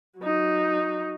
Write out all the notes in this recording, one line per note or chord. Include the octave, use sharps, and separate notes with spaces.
F#3 D#4